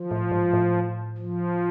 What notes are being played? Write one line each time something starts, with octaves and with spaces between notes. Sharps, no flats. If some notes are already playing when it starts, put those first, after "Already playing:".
Already playing: F3
A2
G#2
A2
F3